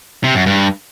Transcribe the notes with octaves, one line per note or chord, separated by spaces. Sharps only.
C3
F#2
G2